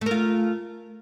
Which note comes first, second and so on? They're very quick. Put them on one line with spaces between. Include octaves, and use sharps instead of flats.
A3 A#4 F4